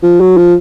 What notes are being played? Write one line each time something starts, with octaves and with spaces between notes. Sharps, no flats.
F3
F#3
F3